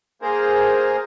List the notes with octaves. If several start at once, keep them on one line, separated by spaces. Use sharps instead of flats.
A#3 G#4 A#4 C5